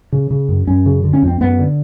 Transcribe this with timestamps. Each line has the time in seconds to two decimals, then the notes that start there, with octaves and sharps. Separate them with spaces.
0.12 C#3
0.31 C#3
0.49 F#2
0.67 F#2 C#4
0.86 C#3
1.04 D3
1.13 C#4
1.22 F2
1.28 C4
1.41 F#2 B3
1.59 D3